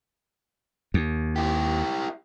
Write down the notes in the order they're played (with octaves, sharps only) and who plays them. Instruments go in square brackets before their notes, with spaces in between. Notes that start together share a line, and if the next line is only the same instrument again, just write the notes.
[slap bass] D#2
[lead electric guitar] E4 G4